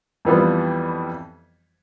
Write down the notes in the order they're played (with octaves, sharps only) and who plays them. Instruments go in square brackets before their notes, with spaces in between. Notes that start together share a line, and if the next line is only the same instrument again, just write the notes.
[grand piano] F2 E3 G3 B3 F4